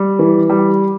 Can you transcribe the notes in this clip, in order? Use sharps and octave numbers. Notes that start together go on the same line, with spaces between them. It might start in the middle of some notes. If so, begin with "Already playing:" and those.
Already playing: G3
E3
G3